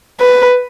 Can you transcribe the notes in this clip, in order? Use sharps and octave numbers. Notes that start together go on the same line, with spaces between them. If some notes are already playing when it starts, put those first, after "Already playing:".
B4